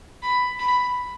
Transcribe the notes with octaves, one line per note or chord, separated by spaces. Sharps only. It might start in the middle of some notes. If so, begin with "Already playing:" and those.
B5
B5